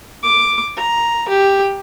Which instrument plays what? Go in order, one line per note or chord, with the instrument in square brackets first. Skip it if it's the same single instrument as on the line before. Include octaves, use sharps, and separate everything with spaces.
[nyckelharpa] D6
A#5
G4